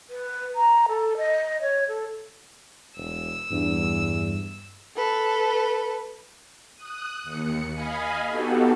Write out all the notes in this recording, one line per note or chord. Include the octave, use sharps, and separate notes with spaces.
B4
A#5
A4
D#5
C#5
A4
E1 E6
E2 G2
A4 B4
D#6 F#6
D#2 C#7
D#5 F5 G#5 B5
B3 D#4 F#4 G4 A4